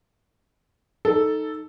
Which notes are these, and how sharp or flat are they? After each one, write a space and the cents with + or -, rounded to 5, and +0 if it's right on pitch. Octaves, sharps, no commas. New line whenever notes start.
D#4 +0 A4 +0